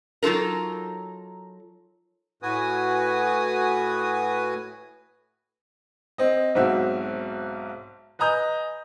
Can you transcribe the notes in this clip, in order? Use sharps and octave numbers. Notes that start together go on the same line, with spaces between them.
F#3 D#4 F4 A4 A#4
A2 F#4 B4 G#5 D#6
C4 D#5
B1 G#2 C4 F#4 E5
B4 D#5 G#5 A#5 D#6 G6